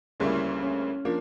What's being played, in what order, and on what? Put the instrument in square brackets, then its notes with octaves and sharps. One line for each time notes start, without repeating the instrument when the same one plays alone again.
[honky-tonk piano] D2 C#3 G3 A#3 E4 [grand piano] C#4
[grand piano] C#4
[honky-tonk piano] F3 A#3 [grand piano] D4